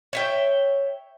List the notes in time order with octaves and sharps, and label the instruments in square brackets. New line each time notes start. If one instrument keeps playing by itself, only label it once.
[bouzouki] C#5 E5 G5